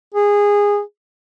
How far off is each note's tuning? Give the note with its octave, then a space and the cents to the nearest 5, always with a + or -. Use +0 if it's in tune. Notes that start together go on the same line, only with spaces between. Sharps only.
G#4 -20